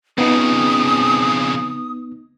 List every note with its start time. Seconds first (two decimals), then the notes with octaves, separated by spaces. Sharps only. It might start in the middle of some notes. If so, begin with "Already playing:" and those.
0.18 F2 C#3 B3 D#4 D#6